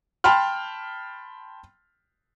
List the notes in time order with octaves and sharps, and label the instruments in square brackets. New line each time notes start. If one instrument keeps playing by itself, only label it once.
[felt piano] G5 A5 B5 C6 F6